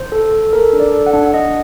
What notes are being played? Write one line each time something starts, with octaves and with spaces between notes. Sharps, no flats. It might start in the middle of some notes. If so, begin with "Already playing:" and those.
Already playing: C5
A4
A4
A4 A#4
D4
D5
A4
F#5
D4
F#5
D4 D#5